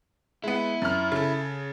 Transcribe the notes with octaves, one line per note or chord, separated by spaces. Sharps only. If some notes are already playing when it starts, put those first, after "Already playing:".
G#3 B3 E4
F#2 F6
C#3 A4